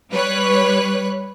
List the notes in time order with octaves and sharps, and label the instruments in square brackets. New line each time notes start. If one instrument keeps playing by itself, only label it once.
[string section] G3 B4 C#5 F#6